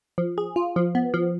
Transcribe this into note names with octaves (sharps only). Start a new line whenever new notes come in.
F3
G#4
F4
F3
B3
F3